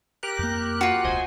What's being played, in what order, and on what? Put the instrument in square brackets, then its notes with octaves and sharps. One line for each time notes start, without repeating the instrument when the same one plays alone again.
[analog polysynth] G4 A#4 F#6
[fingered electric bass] F2 A#3
[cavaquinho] F4 F#4
[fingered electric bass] E1 C#2 [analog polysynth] C5 D#5 G#5